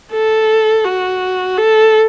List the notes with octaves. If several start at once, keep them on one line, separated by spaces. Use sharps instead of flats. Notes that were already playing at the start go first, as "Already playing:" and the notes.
A4
F#4
A4